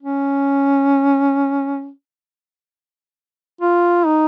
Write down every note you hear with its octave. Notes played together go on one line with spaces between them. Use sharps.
C#4
F4
D#4